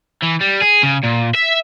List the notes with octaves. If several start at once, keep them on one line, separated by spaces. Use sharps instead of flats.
E3
G3
G#4
C#3
A#2
E5